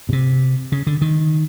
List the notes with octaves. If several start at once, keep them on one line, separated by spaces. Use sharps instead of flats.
B2
C3
C#3
D3
D#3